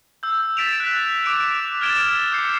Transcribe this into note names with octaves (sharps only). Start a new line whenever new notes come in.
E6 G6
A6 B6 D7 E7 F7
F#6
D6 D7 F7
F6 G#6 A6 D7 E7 G7
D6 G6 C7 C#7